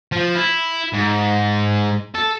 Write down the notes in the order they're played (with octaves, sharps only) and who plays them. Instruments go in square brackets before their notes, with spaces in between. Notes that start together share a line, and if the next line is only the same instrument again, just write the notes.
[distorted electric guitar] F3
E4
G#2
A4